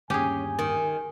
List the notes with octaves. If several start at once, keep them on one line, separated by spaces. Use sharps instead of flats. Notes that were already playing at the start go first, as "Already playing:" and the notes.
G1 D#2 C#4 G4 G#4 G#5
D#3